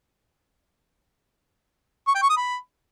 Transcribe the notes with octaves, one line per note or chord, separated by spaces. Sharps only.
C#6
G5
C#6
D#6
B5